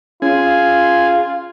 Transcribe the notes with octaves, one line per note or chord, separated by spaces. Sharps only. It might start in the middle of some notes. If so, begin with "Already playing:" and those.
C#4 F4 G#4